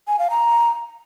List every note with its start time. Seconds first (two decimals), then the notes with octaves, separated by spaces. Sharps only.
0.08 G#5
0.19 F5
0.30 A#5